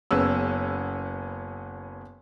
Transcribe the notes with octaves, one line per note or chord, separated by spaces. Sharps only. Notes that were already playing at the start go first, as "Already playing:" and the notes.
F#1 B3 C#4 E6